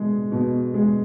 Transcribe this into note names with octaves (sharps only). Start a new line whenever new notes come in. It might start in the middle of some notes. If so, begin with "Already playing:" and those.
Already playing: B2 G#3
B2
G#3